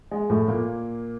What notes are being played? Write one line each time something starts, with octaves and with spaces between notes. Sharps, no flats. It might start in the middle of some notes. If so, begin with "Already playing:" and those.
G#3
A2 A3
A#2 A#3